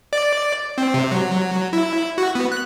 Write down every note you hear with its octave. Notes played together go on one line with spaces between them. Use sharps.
D5
C4
C3
F#3
E4
F#4
B3
F#6